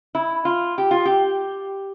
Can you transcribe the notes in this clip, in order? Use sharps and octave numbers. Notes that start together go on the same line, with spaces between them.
E4
F4
G4
F4
G4